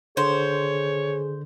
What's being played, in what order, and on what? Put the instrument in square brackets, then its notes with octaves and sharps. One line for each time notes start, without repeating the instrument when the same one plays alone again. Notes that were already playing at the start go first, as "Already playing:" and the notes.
[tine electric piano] D3 [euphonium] G#4 [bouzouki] C5 [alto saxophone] C#5